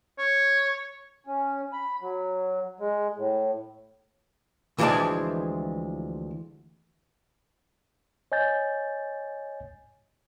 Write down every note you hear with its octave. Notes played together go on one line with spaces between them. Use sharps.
C#5
C#4
B5
F#3
G#3
A2
D2 E3 F3 G#3 D5 A5
C#5 D#5 G#5 G6 A6